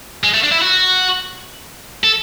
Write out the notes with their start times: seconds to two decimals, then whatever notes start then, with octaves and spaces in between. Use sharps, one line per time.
0.24 G#3
0.34 A3
0.43 D4
0.52 E4
0.62 F#4
2.04 A4